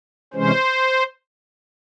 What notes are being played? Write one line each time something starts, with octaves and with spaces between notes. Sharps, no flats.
C3 E3 G#3 C#4 C5